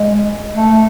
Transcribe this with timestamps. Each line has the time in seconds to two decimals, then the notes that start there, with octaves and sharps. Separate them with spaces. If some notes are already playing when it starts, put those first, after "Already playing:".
Already playing: G#3
0.56 A3